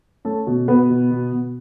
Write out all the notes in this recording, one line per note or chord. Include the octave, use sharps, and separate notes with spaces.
A3 C#4 A4
B2
B2 B3 B4
B2
B2
B2